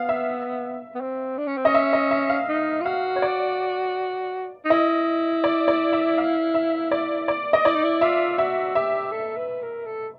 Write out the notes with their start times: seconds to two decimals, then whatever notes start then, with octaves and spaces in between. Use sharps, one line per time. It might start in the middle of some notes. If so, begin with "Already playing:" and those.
Already playing: B3 F5
0.09 E5
0.95 B3
1.01 C4
1.38 D4
1.47 C#4
1.57 C4
1.65 C#4 D#5
1.74 E5
1.93 D#5
2.11 E5
2.29 F5
2.48 D#4
2.81 F4
2.85 F#4 F5
3.16 C#5
3.22 D5
4.65 D#4
4.70 E4 D#5
5.44 D5
5.68 D5
5.93 E5
6.18 F5
6.54 E5
6.91 D5
7.28 D5
7.53 D#5
7.65 E4 D5
7.75 D#4
7.83 E4
8.01 F4 E5
8.38 F#4 E5
8.75 G4 E5
9.12 A4
9.37 B4
9.62 A#4
9.86 A4